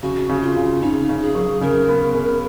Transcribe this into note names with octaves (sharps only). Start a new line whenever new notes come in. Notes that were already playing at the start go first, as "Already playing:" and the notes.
C#3 F#4
C#3
F4
C#3
C#3 D#4
C#3
G#4
F#3
C#3 A#4
B3
C#3